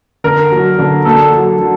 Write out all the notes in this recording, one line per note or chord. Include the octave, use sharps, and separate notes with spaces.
D3 A#4
F#3
D3
A#3 A4
F#3
F#3